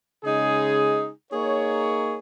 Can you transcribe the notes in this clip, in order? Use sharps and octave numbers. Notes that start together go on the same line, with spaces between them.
C#3 G#3 D#4 G#4
A#3 D#4 G#4 C#5